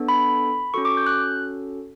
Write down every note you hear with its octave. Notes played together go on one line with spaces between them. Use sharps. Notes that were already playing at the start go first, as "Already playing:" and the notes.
Already playing: B3 D4 A4
B5
C#4 F#4 A4 C#6
D6
G6
F#6